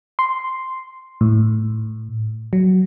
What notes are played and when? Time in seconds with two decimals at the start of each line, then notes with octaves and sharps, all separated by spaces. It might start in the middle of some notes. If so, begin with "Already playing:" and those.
0.19 C6
1.21 A2
2.53 F#3